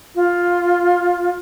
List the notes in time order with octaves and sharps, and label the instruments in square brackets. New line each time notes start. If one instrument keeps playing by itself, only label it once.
[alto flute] F4